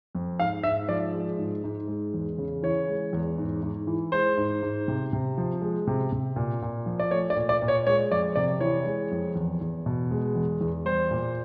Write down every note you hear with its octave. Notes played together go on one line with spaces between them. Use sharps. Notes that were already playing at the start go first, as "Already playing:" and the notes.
F2
G#2 F5
G#2 E5
F3 D5
G#3
G#2
G#2
G#3
E2
C#3
E3 C#5
G#3
E2
G#2
G#2
E3
G#3 C5
G#2
G#2
C3
C3
F3
G#3
C3
C3
A#2
A#2
F3
D5
A3 C#5
D5
A#2
D5
A#2
C#5
G#3 C#5
F2 D5
C3 D5
E3 C#5
G#3
F2
E2
E2
B2
G#3
E2
E2
G3 C5
A#2